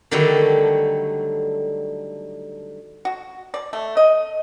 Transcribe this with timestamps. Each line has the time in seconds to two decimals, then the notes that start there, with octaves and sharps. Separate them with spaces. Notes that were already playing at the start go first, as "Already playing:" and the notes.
0.11 D3 D#3 F#3 G3 A3
3.05 F#4
3.54 D5
3.73 A3
3.97 D#5